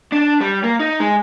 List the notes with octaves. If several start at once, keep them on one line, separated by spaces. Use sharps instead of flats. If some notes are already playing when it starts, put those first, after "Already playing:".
D4
G3
A#3
D#4
G#3